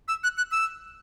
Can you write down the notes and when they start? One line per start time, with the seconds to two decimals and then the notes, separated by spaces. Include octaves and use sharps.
0.08 E6
0.23 F#6
0.37 F#6
0.51 E6